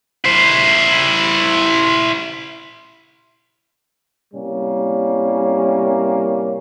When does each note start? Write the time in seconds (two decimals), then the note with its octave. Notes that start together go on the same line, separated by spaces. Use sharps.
0.25 E4 C5
4.34 A2 C3 G3 A#3 C#4